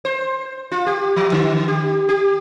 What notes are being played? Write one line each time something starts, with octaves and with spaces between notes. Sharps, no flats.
C5
F4
G4
F3
D3
G4
G4